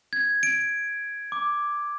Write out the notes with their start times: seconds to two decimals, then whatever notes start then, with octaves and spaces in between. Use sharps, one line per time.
0.13 G#6
0.43 D7
1.32 D6